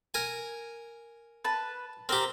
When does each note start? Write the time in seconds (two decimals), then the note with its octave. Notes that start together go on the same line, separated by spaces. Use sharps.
0.14 A#4 G#5
1.45 B4 A5
2.09 C4 G4 A#4